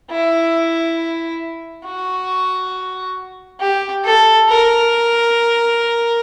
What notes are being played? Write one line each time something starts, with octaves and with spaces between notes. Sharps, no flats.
E4
F#4
G4
A4
A#4